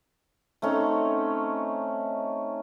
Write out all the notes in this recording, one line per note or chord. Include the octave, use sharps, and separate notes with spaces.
A3 C4 C#4 D#4